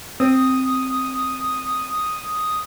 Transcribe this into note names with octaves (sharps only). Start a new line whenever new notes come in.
C4 D#6